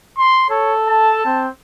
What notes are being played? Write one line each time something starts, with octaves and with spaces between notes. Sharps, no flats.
C6
A4 C#5
A5
C4